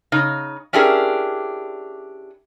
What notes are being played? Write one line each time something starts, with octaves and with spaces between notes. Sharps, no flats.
C#3 D#4
C#4 D4 E4 G4 G#4 A#4